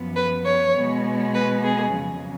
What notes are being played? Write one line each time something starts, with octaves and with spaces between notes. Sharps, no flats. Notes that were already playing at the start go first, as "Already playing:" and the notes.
Already playing: F#2 F3 B3
B4
C#5
B2 G#3 B3
B4
G#4
F2 C#3 F#3